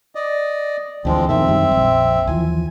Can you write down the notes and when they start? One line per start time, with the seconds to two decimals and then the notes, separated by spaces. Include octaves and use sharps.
0.15 D5 D#5
1.05 D2 D3 E3 F3 G#3 C4
1.29 F2 B2 D#3 C4 E5
1.48 F#2 D#3 G3
1.71 A#1 F2
2.27 D#2 E3 F3 G#5